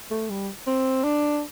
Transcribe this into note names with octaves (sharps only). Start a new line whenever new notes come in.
A3
G3
C4
D4